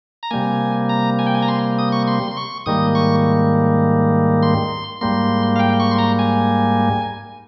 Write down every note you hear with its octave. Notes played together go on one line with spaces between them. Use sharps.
A#5
C3 G3 A#3 G#5
A#5
G#5
G5
G#5
A#5
C6
D#6
C#6
C6
C6
C#6
G#2 D#3 G3 A#3 D#6
C#6
C6
G#2 G3 A#3 C6
F5
G5
C#6
C6
A#5
G#5